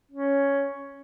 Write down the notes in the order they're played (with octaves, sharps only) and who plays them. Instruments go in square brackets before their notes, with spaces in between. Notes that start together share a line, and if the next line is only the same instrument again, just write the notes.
[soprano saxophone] C#4